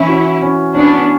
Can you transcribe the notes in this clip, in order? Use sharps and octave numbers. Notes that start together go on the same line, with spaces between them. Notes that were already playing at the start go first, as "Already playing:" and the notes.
Already playing: E3 C#4 E4
F#4
C#4
B3 C#4 D4